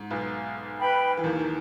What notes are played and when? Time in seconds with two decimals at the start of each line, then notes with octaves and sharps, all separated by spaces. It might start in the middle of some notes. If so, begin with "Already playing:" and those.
Already playing: G#2
0.10 B1 B2
0.79 B4 G5 B5
1.17 E3
1.24 D#2 D#3
1.39 D#3